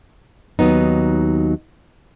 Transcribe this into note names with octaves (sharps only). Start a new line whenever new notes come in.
D#2 F#3 B3 D#4